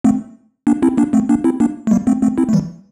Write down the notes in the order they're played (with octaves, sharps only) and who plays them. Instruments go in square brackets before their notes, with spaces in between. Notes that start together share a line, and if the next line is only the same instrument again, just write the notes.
[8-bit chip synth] A3 C4
A#3 D4
C4 E4
A#3 D4
A3 C4
A#3 D4
C4 E4
A#3 D4
A3
G3 A#3
A3 C4
A3 C4
C4 E4
A3
E3 G3